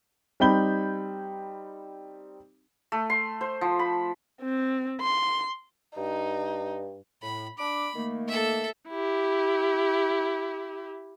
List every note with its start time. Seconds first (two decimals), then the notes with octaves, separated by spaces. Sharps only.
0.40 G3 C4 D#4 B5 G6 G7
2.92 A3
3.10 C6
3.41 C5
3.61 F3
3.79 B5
4.41 C4
5.01 C6
5.97 G2 D#4
7.23 A2 B5
7.58 D4 B5 D6
7.95 D#3 A3 A#3
8.28 A4 E5
8.89 E4 G4